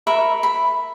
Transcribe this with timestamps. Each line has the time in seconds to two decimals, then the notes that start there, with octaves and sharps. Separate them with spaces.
0.07 A#4 E5 B5 C#6
0.43 B5